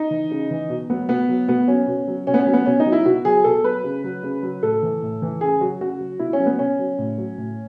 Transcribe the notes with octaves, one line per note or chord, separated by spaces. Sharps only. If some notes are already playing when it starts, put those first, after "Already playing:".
Already playing: D#4
E3
C#3
E3
B2
F#3 B3
B2 B3
F#3
B2 B3
F#3 C#4
B2
F#3
B2 C#4
B3
C#4
F#3
B3
B2 C#4
D#4
F#3
E4
B2 F#4
F#3 G#4
B2 A4
F#3 B4
C#3
F#3
C#3
F#3
A2 A4
E3
A2
E3
C#3 G#4
F#3 F#4
C#3 F#4
F#3
B2 E4
C#4
F#3
B3
B2 C#4
F#3
A2
F#3
A2